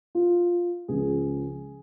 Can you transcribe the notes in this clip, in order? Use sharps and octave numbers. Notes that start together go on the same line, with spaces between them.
F4
C#2 C#3 F3 G#4